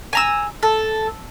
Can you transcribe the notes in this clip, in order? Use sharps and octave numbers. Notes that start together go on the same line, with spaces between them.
G#5 A#5 E6
A4